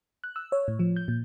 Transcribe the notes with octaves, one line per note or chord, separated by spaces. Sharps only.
F#6
E6
C#5
A2
F3
G6
A#2